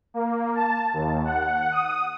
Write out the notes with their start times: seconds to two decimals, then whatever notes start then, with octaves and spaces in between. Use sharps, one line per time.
0.14 A#3
0.55 A5
0.93 D#2
1.25 F#5
1.72 D#6